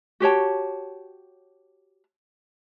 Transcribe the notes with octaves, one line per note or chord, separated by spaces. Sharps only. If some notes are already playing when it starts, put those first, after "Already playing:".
F#4 G4 C#5 A5